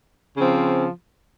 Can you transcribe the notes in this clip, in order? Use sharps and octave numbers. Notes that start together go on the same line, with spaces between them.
C#3 F3 C4